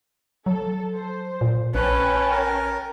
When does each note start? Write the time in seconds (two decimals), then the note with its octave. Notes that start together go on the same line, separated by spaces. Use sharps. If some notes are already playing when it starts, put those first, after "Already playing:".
0.46 F#3 A4
0.94 C5
1.41 A#2
1.74 A#1 C#4 B4 G5 A5
2.31 A#4